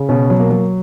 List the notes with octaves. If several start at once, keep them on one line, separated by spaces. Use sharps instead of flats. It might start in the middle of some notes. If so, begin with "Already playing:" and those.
Already playing: C#3
B2 C#4
F#3
A#3
F#3